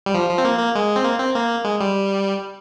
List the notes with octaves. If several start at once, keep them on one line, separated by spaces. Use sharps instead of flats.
G3
F3
F3
C4
A#3
A#3
G#3
C4
A#3
C4
A#3
G#3
G3